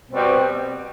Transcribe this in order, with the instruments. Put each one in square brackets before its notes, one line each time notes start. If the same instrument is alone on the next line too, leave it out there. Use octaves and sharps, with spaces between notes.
[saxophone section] B2 G3 C4